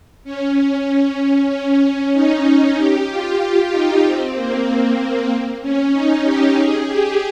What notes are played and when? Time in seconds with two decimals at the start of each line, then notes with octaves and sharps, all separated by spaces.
0.24 C#4
1.50 C#4
2.13 D#4
2.77 G4
3.09 F4
3.40 F4
3.72 D#4
4.03 C4
4.35 A#3
5.61 C#4
5.93 D#4
6.24 G4
6.56 G#4
6.88 G4